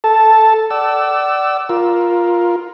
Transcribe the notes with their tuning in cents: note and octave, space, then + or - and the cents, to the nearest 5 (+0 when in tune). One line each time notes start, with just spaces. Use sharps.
A4 +0 A5 +0
D5 +0 F#5 +40 E6 +0
F4 +0 A#4 +15